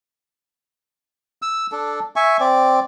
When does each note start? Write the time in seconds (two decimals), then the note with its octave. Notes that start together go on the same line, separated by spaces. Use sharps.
1.42 E6
1.72 D4 A4
2.16 E5 G#5 C#6
2.40 C4 D5